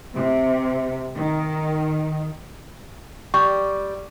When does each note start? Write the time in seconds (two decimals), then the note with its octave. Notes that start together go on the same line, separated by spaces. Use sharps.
0.16 C3
1.17 D#3
3.34 G3 C#6